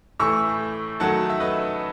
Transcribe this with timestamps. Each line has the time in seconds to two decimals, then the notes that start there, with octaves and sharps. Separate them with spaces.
0.20 A2 E3 A3 C#6 E6
1.00 D#3 F#3 A3 F#5 A5
1.30 E5
1.40 B4 D#5